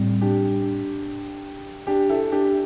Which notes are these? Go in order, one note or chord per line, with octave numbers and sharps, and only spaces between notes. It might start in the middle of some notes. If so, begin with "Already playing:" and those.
Already playing: A2 G3 C4
D4 G4
D4 G4
E4 A4
D4 G4